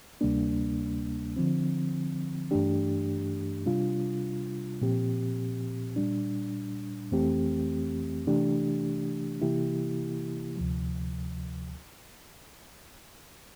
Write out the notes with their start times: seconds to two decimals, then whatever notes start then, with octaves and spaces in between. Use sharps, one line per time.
0.21 D2 C3 G3 A#3 D4
1.37 D3 F3 C4
2.51 G2 E3 A3 D4 G4
3.66 C3 G3 D4 F4
4.82 A#2 F3 C4 G4
5.96 A#2 G3 D4
7.12 F2 E3 A3 C4 G4
8.26 C3 E3 A3 D4 G4
9.42 C3 E3 A#3 E4 G4
10.57 D2 C3 F3